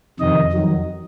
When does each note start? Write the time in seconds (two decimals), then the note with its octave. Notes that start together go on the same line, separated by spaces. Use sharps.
0.20 F2 C3 D#3 D#5
0.52 F2 D#3 F#3